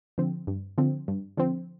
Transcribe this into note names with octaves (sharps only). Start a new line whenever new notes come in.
D3 F3 C4
G2
D3 F3 C4
G2
D3 F3 C4